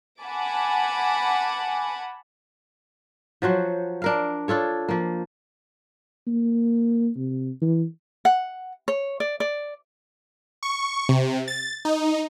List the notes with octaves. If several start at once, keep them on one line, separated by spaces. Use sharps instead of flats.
F#5 G#5 A5 B5 D6
F3 F#3 F#4 C5
D4 A#4 F5
D4 F4 A4 C#5
F3 A#3
A#3
C3
E3
F#5
C#5
D5
D5
C#6
C3
A6
D#4